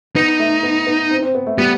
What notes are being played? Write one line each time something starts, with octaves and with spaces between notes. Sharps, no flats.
B3 D#4
A3
B3
B3
C4
C4
B3
A3
G3 B3